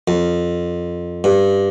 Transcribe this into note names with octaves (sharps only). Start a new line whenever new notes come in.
F2
G2